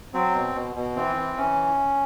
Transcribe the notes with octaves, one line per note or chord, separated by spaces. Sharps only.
F#3 C4
B2
B2
B2
E3 C4
E3
E3 C#4